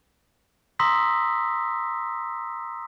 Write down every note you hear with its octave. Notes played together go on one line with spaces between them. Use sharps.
A#5 C6 D#6 E6 A#6 B6